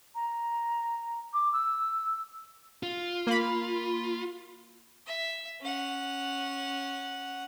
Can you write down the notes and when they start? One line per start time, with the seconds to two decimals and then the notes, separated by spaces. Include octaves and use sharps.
0.15 A#5
1.33 D6
1.53 E6
2.83 F4
3.27 A#3 B5
5.06 E5
5.61 C#4 F#5